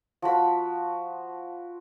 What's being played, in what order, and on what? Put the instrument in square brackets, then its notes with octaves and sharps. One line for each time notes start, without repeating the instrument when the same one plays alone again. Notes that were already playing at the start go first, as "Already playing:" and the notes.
[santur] F3 F#4 B5